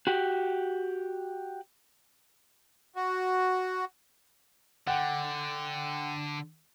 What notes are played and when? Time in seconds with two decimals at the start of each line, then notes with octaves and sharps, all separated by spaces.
0.07 F#4 G4
2.96 F#4
4.87 D3 F#5 G5